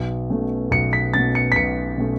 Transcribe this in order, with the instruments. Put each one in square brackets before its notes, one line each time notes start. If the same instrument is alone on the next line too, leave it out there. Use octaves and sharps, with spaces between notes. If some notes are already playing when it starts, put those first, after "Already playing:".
Already playing: [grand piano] B1
B2 A3 C#4
B1 C#7
B6
B2 A3 C#4 A6
C#7
B6
B1 C#7
B2 A3 C#4